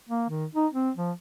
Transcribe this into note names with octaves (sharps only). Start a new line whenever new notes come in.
A#3
D#3
D#4
C4
F3